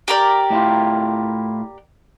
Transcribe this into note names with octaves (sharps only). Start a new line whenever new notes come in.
G4 A#4 D5
A2 E4 F4